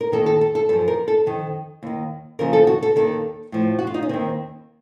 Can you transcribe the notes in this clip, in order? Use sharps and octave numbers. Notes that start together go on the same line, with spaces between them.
A#4
D#2 D#3 A4
A4
A4
A4
F#2 F3 A4
A#4
A4
F2 D#3
D#2 D#3
D#2 C#3 F3 A#4
A4
F#4
A4
D#2 D#3 A4
A2 F3
F#4
F4
D#4
C#4
D#2 D#3 C4